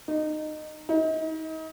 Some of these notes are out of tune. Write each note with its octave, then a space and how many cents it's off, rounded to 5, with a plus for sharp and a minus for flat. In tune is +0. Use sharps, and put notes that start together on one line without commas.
D#4 -20
D#4 +35